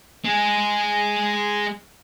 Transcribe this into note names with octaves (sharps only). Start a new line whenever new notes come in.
G#3 G#4